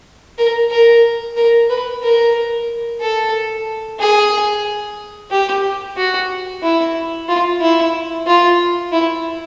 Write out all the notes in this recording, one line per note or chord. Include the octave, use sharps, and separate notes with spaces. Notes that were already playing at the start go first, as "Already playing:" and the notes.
A#4
A#4
A#4
B4
A#4
A4
G#4
G4
F#4
E4
F4
E4
F4
E4